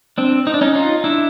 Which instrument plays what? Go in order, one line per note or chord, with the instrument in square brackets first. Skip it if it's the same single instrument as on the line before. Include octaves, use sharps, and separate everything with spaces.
[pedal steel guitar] C4 D4
D#4
D4
C#4 D#4
D#4 F4
D4 E4